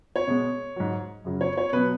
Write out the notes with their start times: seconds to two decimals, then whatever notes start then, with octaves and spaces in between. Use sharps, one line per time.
0.16 C#5
0.27 B2 G#3
0.76 G#2 F#3
1.25 F#2 C#3 F#3
1.41 C#5
1.58 C#5
1.73 B2 F#3 B4